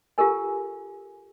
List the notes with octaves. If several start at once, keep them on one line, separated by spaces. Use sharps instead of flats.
F4 G4 A4 A#4 G#5